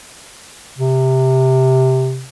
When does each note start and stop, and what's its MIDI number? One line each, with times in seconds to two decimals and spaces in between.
0.79 2.27 48